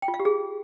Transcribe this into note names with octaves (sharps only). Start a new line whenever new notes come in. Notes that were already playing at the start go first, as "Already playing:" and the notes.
G5
F4
F5
G4
G#4